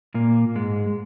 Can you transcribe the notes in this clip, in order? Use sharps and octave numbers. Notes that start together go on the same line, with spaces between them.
A#2 A#3
G#2 G#3